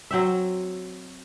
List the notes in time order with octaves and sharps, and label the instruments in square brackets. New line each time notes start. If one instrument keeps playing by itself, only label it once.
[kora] F#3 C4 E5